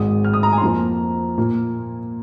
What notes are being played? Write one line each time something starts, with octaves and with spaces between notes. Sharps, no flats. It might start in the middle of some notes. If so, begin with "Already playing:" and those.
Already playing: G#1 G#2 G#3 D#6
F6
D#6
A#5
G#5
C6
F2 F3 A#3 A#5
A#2 A#3